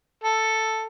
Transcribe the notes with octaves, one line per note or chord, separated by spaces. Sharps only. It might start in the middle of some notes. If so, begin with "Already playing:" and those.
A4